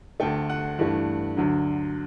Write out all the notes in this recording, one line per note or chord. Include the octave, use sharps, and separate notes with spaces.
D2 D3 A3 G5
F#5
G2 E3 A3
D2 D3 F#3